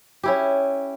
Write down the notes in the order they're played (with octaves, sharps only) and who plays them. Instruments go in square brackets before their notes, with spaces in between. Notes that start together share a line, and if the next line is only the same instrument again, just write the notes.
[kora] C#4 E4 G4